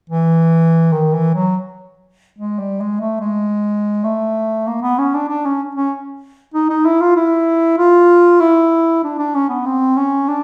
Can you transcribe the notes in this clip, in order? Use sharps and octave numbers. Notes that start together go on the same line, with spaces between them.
E3
D#3
E3
F#3
G#3
G3
G#3
A3
G#3
A3
A#3
B3
C#4
D4
D4
C#4
C#4
D#4
D#4
E4
F4
E4
F4
E4
D4
D4
C#4
B3
C4
C#4
D4